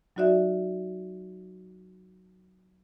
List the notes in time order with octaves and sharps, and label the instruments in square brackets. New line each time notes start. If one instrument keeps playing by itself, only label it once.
[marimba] F#3 D#4 F#4 D5 E5